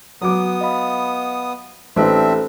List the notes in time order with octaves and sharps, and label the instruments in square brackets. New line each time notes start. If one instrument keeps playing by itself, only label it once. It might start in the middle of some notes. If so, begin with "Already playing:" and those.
[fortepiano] F#3 D6 [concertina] B3 D#6
[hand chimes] D#5 F5 B5
[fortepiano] A1 D#4 D#5 [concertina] C4 D4 E5 [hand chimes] A4 C5